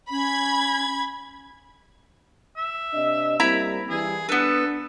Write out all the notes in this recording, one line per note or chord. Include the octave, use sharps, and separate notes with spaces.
C#4 B5 G#6
E5
C3 D4 D#5
G3 A#3 C4 E4 A#5 B5
G2 E3 G#4
B3 D4 A4 B4